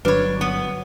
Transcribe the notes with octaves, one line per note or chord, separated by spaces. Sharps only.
G1 F#3 D4 B4 C#5 B5
B3